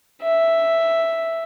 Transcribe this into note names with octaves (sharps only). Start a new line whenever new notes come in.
E5